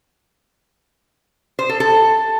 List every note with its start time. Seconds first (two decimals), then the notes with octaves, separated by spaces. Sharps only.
1.59 C5
1.69 A4
1.80 A4